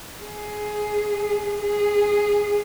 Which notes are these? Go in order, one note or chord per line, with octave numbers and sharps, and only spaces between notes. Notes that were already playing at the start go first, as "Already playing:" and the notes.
G#4
G#4